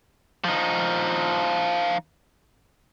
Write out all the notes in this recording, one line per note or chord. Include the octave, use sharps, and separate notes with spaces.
F3 D#4